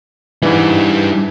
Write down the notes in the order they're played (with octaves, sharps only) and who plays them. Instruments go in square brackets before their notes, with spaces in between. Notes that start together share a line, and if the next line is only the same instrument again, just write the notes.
[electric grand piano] G#2 E3 [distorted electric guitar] G3 D4